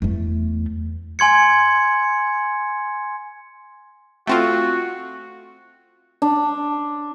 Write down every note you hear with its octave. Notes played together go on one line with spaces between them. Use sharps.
E2 A3
G#5 C6 G#6 C#7
A3 C4 F4 F#4
D4